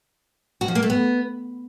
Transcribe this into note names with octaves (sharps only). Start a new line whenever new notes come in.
F#4
F3
A#3
A3
B3